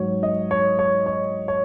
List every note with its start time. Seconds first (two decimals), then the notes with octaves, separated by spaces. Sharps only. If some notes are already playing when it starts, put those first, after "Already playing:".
Already playing: G#2 F#3 C#5
0.23 D#5
0.51 C#5
0.79 C#5
1.06 C#5
1.48 C#5